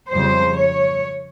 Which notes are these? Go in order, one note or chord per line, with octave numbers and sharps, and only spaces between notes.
F2 C#3 G3 C5
C#5